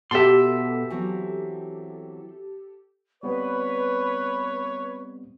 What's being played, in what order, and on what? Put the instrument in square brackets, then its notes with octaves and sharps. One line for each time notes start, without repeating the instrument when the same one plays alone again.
[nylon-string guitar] B2 [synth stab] G4 A4 [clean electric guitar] E5 C6
[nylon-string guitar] E3 F#3 C4
[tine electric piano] G3 B3 C4 [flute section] B4 [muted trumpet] C#5